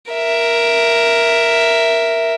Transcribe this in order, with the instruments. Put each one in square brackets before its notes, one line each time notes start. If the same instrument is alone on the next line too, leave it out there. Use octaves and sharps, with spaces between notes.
[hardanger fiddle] A#4 E5